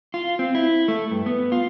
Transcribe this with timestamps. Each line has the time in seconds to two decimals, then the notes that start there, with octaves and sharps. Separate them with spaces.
0.14 F4
0.39 C4
0.55 E4
0.88 A3
1.11 G2
1.26 B3
1.52 F4